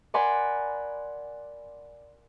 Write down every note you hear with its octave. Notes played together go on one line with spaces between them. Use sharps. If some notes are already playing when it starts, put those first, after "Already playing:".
A#4 D5 F#5 G#5 B5 C6